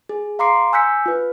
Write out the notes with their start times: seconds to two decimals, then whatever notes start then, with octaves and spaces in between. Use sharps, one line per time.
0.09 G#4
0.39 F5 A#5 C6 D6 C7 C#7
0.73 G#5 E6 F#6 G6 B6 C#7
1.06 F4 B4